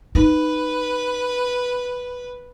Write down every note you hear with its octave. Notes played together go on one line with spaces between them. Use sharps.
D#4 B4